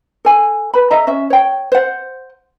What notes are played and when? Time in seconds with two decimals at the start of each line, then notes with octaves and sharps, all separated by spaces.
0.25 A4 G#5
0.74 B4 B5
0.91 A4 D#5 E5 A#5
1.07 C#4 E5
1.30 C#5 G5
1.72 C5 F#5